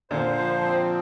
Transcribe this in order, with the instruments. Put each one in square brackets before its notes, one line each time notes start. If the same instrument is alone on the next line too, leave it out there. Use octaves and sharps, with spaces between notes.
[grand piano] A#2 D3 [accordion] C5
[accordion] F3
C4